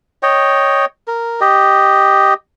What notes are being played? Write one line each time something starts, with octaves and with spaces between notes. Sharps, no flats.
C#5 D#5 G5
A#4
G4 D#5